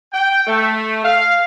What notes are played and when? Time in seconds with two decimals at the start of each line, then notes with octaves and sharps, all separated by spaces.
0.13 G5
0.46 A3
1.04 F5